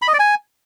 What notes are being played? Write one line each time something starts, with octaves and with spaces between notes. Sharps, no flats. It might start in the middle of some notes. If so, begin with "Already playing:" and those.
B5
D#5
D5
G#5